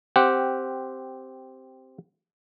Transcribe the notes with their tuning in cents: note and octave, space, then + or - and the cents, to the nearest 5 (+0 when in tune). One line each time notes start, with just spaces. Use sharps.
C4 +0 G4 -5 F#5 +0